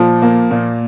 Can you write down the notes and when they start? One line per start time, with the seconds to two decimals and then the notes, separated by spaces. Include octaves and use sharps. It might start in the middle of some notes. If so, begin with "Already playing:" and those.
Already playing: A#2 F3
0.22 A#3
0.51 A#2